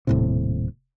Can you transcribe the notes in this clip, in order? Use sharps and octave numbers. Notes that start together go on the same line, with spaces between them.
D#1 A2 C3